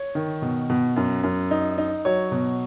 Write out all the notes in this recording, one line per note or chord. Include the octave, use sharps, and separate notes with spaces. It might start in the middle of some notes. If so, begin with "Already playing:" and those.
Already playing: C#5
D#3
B2
B2
F#2
F#2
D#4
D#4
F#3 C#5
B2